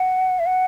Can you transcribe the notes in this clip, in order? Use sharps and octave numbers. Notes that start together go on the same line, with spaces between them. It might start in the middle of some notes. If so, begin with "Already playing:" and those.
Already playing: F#5
E5
F#5